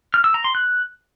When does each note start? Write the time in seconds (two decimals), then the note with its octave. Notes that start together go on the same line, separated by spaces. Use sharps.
0.14 F6
0.24 E6
0.34 A#5
0.44 C6
0.55 F#6